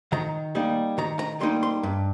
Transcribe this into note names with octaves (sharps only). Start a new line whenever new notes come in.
D#3 A#5
G3 A#3 D#4
D#3 A#5
A#5
G3 A#3 D#4 C6
C6
G2